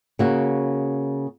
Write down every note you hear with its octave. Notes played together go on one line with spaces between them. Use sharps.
C#3 A#3 F#4